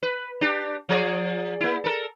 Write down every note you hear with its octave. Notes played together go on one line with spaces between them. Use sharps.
B4
D4 G4
F3 G#4 D5
A#3 E4
A4 A#4